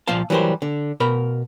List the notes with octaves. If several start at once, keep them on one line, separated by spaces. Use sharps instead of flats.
C2 A#2 F3 F4 F5 A5
E3 F#3 G3 A#4 C5
D3
B2 A#4 B5